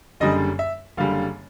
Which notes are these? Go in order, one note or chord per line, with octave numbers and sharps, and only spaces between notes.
F#1 F#2 D3 G3 D#5
E5
F#1 F#2 D3 G3 F5